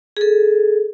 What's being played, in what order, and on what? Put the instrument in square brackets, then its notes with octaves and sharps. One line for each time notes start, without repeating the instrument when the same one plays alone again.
[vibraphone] G#4 A4